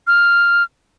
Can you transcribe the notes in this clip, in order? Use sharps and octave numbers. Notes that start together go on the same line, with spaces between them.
F6